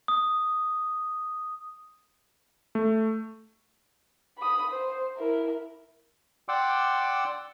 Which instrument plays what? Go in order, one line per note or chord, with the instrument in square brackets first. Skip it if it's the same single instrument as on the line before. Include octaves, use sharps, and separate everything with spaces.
[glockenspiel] D#6
[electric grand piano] A3
[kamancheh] B5 D#6
C5
E4 A#4
[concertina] D5 F#5 G5 C6 D6 E6